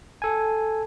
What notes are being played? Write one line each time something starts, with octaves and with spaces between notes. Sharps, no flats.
A4 G#5